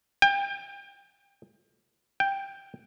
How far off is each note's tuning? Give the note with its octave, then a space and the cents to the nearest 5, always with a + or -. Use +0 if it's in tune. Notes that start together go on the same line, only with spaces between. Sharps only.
G5 +30
G5 +5